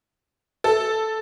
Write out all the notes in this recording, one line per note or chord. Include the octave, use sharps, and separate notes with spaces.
A4